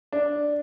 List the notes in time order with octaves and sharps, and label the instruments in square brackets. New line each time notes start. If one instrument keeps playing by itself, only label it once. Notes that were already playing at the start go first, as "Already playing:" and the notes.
[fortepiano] D4